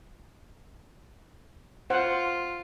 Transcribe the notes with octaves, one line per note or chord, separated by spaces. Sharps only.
F4 C5 F#5